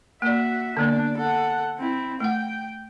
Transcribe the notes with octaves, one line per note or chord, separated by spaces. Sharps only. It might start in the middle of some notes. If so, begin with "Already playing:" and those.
A#3 F#4 D5 E5
D3 A#3 B3 D4
A4 F#5
C4 E4
A3 F#5 G5